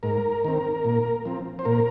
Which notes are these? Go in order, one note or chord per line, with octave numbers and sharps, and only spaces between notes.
G#2 A#4
D#3 C4
A#2
F3 C4
C5
A#2 A#4